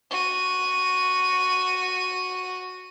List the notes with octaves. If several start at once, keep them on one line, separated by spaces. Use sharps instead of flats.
F#4 D#7